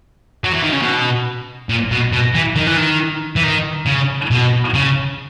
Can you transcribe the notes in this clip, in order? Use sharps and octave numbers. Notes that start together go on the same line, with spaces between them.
F#3
E3
D#3
C#3
B2
A#2
B2
B2
E3
D#3
E3
D#3
E3
D#3
C#3
B2
C#3